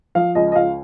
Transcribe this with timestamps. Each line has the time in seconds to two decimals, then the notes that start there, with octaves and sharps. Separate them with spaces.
0.15 F3 F5
0.35 C#2 D#5
0.52 D#5
0.56 C#2 F5